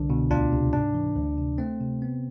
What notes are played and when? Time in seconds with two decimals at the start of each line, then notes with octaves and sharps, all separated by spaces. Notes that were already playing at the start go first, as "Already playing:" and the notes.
Already playing: C2 D3 D4
0.10 B2
0.30 D2 D4 F4
0.53 C3
0.73 G#2 D4
0.95 E3
1.16 D2
1.38 C3
1.58 A3 C4
1.81 C3
2.02 B3